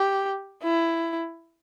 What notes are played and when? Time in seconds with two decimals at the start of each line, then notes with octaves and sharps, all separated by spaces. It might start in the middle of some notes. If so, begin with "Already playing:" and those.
Already playing: G4
0.63 E4